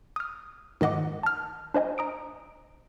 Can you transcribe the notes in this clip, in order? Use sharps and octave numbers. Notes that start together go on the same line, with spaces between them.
D#6 F6
G#2 D#3 D#5 F#5 D6
A5 F6
D4 C5 D#5 G#5
A#5 D#6 D7